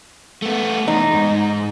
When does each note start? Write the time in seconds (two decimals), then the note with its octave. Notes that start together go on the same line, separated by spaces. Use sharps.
0.42 A3 B3
0.88 E2 D#4
1.13 G#2